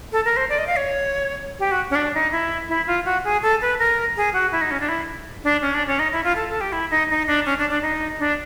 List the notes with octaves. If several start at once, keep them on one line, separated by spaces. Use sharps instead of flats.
A4
A#4
C5
D5
D#5
F5
C#5
G4
F#4
C#4
D4
D#4
E4
E4
F4
F#4
G#4
A4
B4
A#4
G#4
F#4
E4
D#4
C#4
D4
E4
D4
C#4
D4
C#4
D#4
E4
F4
A4
A4
G4
E4
D#4
D#4
D4
C#4
D4
D4
D#4
D4